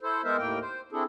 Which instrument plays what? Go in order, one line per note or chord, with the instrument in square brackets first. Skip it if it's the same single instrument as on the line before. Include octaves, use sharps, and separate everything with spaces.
[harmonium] E4 A4 C5
G#3 B3 A#4 C5 E5
D#2 A2 A#3 A#4 G5
C5
C4 D4 E4 G#4 A4